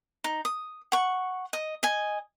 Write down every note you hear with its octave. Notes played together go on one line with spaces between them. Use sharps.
D#4
D#6
F#5 C#6
D#5
D#5 G#5